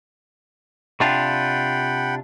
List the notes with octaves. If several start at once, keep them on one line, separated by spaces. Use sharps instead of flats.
C3 D4 F4 F#5 G5 B5